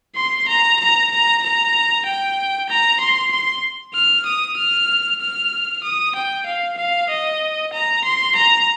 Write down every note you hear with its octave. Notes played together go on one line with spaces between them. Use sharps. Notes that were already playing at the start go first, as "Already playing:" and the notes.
C6
A#5
A#5
A#5
A#5
G5
A#5
C6
C6
F6
D#6
F6
F6
D#6
G5
F5
F5
D#5
A#5
C6
A#5